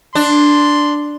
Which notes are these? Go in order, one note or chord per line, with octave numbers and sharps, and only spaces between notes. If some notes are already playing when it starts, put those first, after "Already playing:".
D4 C6